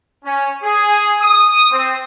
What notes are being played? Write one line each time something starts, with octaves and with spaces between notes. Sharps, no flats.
C#4
G#4
D#6
C4